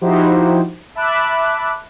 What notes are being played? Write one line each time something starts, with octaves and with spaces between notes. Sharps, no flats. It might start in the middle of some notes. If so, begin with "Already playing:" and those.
F3 D#4 E4 F#4 G4 C5
E5 A5 B5 D6 F#6